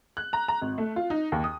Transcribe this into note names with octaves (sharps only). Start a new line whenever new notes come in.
F#6
A#5
A#5
G#1
A3
F4
D#4
D#2
D#6